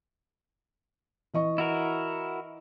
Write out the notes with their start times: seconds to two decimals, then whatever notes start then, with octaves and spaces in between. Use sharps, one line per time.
1.34 E3 D#5 C#6
1.58 E4 F#4 A#4